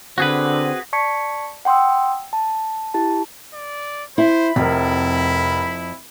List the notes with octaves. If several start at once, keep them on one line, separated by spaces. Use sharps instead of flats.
D3 C4 F#4 G#4 B4
D5 A5 C#6 G#6 B6 C#7
F#5 G5 C6 D#6 E6
A5
E4 G4 A5
D5
E4 C5 B5
F1 F2 E4 A#4